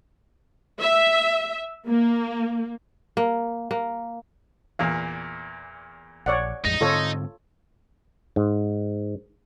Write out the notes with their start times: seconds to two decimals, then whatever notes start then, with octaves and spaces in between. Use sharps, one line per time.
0.80 E5
1.87 A#3
3.17 A#3
3.71 A#3
4.79 E2 A#2 F5
6.26 A#1 C#5 D5 F#5
6.65 A1 F2 G#3 D#4
6.81 G#2 D3 C4 F4 A4 C#5
8.36 G#2